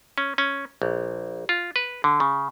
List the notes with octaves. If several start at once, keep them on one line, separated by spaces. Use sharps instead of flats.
C#4
C#4
A#1
F4
B4
D3
C#3